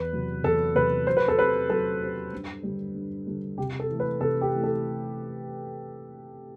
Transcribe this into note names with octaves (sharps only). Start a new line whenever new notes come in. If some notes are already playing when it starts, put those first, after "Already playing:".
Already playing: E2 B4
C3 F#3
E2 A4
C3 F#3 B4
F#3 C5
B4
A4
C4 G4 B4 C5
F#3 A4
C4 G4 C5
G2
D3 G3
G2
D3 G3
C3 G4
A4
E3 A3
B4
C3 A4
G4
E3 A3
A4